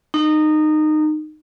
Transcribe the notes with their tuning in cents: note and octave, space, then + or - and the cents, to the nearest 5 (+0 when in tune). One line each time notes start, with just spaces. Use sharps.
D#4 -20